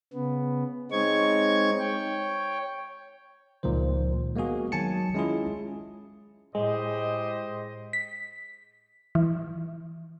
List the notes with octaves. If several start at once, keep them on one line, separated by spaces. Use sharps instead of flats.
C#3 B3
G#3 C4 D#4 C#5 C#6 G#6
C#5 G5
C#2 A#2 D#3 F3 C5
G#3 A#3 B3 F#4 G#4
D#3 F#3 G#5 A5 C#7
G#3 C#4 E4 F4 G#4
A2 G#3 G4 C5 D#5
B6
E3